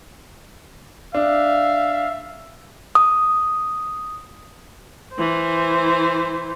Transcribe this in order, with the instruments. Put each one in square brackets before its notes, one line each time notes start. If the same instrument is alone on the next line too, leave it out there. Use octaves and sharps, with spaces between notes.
[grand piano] D4 [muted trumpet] E5 [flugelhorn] F5
[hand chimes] D#6
[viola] E3 C5